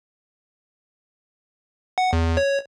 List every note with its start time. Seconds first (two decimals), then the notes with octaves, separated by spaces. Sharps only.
1.98 F#5
2.13 E2
2.37 C#5